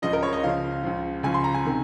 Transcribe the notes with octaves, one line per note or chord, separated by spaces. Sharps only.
C#2 C#3 F3 D#5
A#4
C#5
D#5
C#2 C#3 F3 F5
C#2 C#3 F3
C#2 C#3 F3 G#5
C6
A#5
G#5
C3 D#3